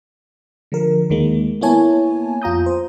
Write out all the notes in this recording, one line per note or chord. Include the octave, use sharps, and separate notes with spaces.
D3 F3 A#4
D#2 D#3 G#3 A#3
A#3 B3 E4 C#5 G#5 A5
F2 F4 A#5 D#6 G6
C5